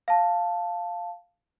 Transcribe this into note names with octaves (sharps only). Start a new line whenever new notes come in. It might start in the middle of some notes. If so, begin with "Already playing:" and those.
F5 A5